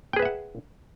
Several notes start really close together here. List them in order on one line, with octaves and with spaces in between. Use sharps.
G5 G#4 B4 E5 F#5